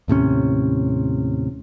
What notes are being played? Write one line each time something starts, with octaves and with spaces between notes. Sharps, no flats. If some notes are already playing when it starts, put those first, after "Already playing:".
D#2 A2 C3 C#4